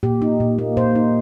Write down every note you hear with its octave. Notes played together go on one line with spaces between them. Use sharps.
A#2 G4
D#4
A#2
A#3
A#2 C5
D#4